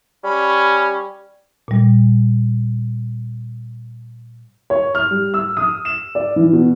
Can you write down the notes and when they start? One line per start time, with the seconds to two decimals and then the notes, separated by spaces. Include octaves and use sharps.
0.24 G3 C#4 B5
1.68 A#2 G3
4.70 C#5
4.95 F6
5.11 G3
5.34 E6
5.57 D#6
5.85 E7
6.15 D5
6.36 E3
6.53 B2